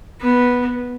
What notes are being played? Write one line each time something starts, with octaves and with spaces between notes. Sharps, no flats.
B3